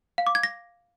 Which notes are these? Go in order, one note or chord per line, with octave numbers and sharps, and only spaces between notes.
F5
D6
G#6
A#6